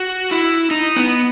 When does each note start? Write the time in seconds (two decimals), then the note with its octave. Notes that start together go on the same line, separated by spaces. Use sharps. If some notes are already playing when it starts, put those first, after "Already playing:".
Already playing: F#4
0.31 E4
0.71 D#4
0.96 B3